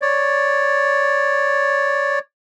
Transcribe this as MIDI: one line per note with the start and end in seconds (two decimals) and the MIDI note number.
0.02 2.19 73
0.02 2.19 74